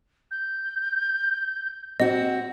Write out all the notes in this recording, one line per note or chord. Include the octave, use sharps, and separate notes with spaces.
G6
C4 F#4 D#5